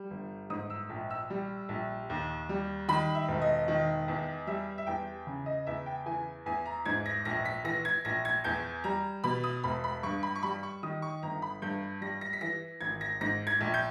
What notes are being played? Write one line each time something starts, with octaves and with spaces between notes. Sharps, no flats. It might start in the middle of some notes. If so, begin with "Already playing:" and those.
Already playing: G3
G1
G#2 D#6
E6
A#1
E6
G3
A#1
D#2
G3
D#3 B5
E5
E1
D#5
D#3
E2
G3 E5
E5
E2 G5
C#3
D#5
E2 E5
G5
E3 G#5
E2 G#5
A#5
G#2 G#6
A#6
A#1 A#6
B6
E3 A#6
G#6
A#1 A#6
G#6
E2 G6
G3 A#5
B2 B5
D#6
E1 B5
B5
G2 C#6
B5
C#6
G3 B5
C#6
D#3 D#6
C#6
G1 A#5
B5
G2 G6
G3 A#6
A#6
B6
E3 A#6
G#1 G#6
A#6
G#2 A#6
G#6
A#1
G6